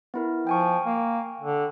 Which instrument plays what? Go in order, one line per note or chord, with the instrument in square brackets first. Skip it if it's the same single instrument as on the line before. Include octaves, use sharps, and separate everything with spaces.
[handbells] B3 E4 A#4
[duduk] F3 [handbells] G5 G#5 C#6
[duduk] A#3
D3